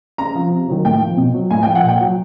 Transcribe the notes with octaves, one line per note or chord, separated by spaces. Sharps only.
C#3 A#5
F3
C3
D#3 F#3
A2 G5
F3
B2
F#3
A2 G#5
F3 G5
F#5
A#2
G5
F#3